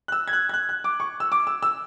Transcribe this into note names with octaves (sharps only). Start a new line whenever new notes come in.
F#6
E6
G#6
F#6
G#6
F#6
F#6
D6
C#6
E6
D6
E6
E6